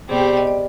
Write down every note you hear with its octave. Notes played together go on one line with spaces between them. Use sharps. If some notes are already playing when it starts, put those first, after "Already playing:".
B2 G3 C4 G#4
G4
D5
D#5
D5